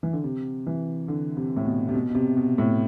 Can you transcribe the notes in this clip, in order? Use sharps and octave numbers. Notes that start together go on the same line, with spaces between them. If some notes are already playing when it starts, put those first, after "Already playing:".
E3
D3
C3
E3
D3
C3
A2
B2
C3
B2
B2
C3
B2
A2